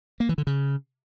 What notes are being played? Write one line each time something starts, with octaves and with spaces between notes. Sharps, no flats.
A#3
E3
D3
C#3